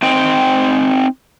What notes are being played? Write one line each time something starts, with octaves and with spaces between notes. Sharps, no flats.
C4 D#4 C5 G5